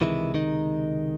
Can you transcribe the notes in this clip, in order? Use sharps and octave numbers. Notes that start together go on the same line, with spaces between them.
C#2 C3 D#3 E3 G#3 E4
D#3 D#4